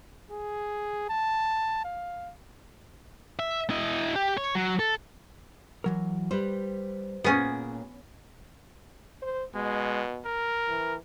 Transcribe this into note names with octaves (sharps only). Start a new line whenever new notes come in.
G#4
A5
F5
E5
E4 D#5
G4
C#5
F#3
A4
E3 F#3 A#4
G3 B4 C5
A#2 B3 C#4 G#4
C5
B2 G#3
A#4
E3